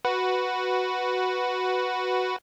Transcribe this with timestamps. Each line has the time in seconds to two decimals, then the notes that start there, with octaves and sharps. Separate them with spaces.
0.05 F#4 B4